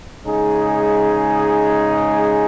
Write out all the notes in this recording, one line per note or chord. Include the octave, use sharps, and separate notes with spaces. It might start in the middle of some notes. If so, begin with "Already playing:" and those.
C#3 G#3 D#4 G#4